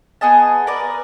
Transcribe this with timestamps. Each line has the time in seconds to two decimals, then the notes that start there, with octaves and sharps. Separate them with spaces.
0.21 B3 G#4 D#5 A5
0.67 A#4 B4 D5